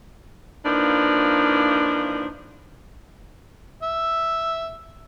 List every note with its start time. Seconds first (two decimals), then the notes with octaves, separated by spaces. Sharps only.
0.64 E3 F3 A#3 D4 D#4
3.82 E5